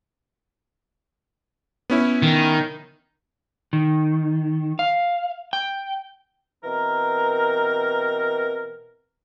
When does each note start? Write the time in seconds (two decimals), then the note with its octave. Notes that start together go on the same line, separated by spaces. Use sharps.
1.90 B3 C#4 E4
2.22 D#3
3.73 D#3
4.79 F5
5.53 G5
6.63 B2 E3 C4 A#4